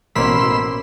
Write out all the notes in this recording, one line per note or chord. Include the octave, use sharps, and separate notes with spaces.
A1 B2 A#3 C#4 B5 C6 E6 B6